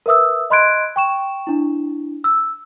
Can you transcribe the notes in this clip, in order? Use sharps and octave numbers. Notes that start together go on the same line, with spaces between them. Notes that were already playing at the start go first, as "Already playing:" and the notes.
A#4 B4 E5 D#6 E6
D#5 B5 C6 F#6 G#6 D7
G5 C#6 E7
D4 E4
E6